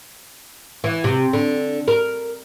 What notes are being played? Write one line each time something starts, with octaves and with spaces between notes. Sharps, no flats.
E3
C3
D3
A#4